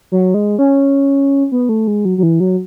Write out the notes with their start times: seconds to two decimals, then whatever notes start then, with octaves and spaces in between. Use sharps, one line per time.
0.12 F#3
0.34 G#3
0.59 C#4
1.52 B3
1.69 A3
1.87 G#3
2.05 F#3
2.18 F#3
2.23 E3
2.40 F#3